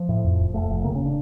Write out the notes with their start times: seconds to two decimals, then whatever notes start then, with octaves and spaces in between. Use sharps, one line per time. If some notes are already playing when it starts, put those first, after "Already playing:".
Already playing: F3
0.09 A2
0.24 F2
0.39 F1
0.54 F1 A3
0.70 F1
0.84 C#3 A#3
0.95 C#4
1.00 C#3
1.06 D4